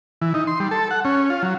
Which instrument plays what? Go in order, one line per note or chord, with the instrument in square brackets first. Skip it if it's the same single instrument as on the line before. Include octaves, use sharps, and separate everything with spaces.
[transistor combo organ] E3
D#4
C6
G3
A4
F#5
C#4
F4
F#3